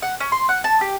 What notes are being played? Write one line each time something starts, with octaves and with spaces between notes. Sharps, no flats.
F#5
C#4
C6
F#5
A5
G4